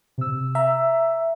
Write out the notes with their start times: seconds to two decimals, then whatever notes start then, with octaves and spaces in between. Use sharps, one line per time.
0.18 C3 E6
0.55 E5 A#5